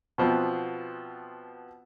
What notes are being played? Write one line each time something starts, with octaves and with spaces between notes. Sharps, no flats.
B2 F3 B3 C4